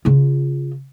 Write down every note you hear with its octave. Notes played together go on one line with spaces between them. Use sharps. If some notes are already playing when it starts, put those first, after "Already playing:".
C#3 F4